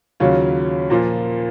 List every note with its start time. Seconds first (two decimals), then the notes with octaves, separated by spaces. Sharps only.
0.20 D#2 C#3 F#3 C#4 F4
0.90 A#2 F3 A#3